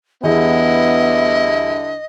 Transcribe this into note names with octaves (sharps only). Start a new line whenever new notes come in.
E2 D3 G3 B3 E4 G#4 D#5